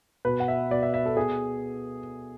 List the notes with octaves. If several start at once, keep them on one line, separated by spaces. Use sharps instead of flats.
B2 B4
F#5
E5
B2 D5
E5
E5
A4
B2 G#4